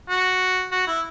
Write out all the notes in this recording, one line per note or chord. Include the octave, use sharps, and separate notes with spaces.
F#4
F#4
E4